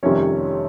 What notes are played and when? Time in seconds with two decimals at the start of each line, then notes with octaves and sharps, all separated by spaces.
0.03 F1 F2 C3 D#3 G3 C#4 C#5